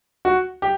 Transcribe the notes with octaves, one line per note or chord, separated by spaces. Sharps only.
F#4
G4